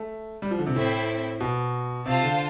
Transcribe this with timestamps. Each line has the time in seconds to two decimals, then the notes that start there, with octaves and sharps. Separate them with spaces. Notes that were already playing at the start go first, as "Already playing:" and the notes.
Already playing: A3
0.42 G3
0.51 F3
0.59 D3
0.66 C3
0.75 A2 C4 E4 A4 E5 G5
1.40 B2
2.06 C3 F4 C5 F5 A5
2.23 D3